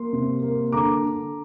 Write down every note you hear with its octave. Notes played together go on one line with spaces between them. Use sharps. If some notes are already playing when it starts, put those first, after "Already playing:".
Already playing: A#3 C6
C3
A#3
D3 A#5 D6
D3